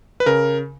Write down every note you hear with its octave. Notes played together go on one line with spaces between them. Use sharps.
B4
C#3 A#4